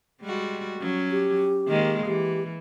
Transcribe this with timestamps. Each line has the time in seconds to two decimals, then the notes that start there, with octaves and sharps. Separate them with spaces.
0.22 G3 G#3 F#4
0.79 F#3 C#4
1.11 G4
1.68 D#3 G#3 A#3
2.06 E3 G4